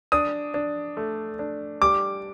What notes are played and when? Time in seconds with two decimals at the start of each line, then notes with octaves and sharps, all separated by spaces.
0.12 D4 D#6
0.54 D4
0.97 A3
1.39 D4
1.82 G3 D6